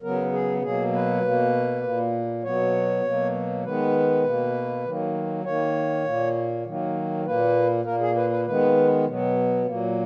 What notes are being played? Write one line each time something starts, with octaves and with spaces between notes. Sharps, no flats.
C#3 F#3 B3 A#4
G#4
B2 F#3 A#3 G#4
B4
B2 A#3
A#2 A#3
B2 F#3 B3 C#5
B2 F#3 A#3
D#3 G#3 B3 B4
B2 A#3
D#3 F#3 A#3
D#3 A#3 C#5
A#2 A#3
D#3 F#3 A#3
A#2 A#3 B4
A#2 A#3 A#4
G#4
B4
B4
D#3 G#3 B3 B4
B2 F#3 B3
A#2 F#3 A#3